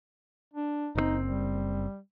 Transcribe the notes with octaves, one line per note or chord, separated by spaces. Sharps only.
D4
F#1 B2 C4 D#4
G3